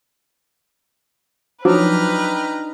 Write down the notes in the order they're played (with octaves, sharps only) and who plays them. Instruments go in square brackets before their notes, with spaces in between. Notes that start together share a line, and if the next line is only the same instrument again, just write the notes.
[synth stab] F3 F#3 [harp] D4 D#4 [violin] B4 [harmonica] G5 A#5 F6